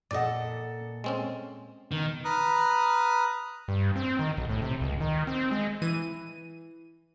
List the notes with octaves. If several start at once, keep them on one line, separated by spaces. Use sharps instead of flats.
A#2 A4 D5 D#5 F#5
G#3 C4 C#4
B2 D#3
B4 A#5 D#6 F6 F#6
G2
C4
D#3
B1
A2
C3
C#2
D#3
C4
G#3
E3 D#7